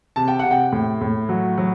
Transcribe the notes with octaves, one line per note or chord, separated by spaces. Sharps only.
C3 A5
G5
F#5
C3
G5
A2
A2
F#3
F#3